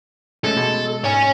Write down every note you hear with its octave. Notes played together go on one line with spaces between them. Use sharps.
G#3 A3 C#4 A4
B2 G#3
G#2 C#5 G#5